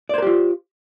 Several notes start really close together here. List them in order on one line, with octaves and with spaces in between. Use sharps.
D5 C5 A#4 G4 F4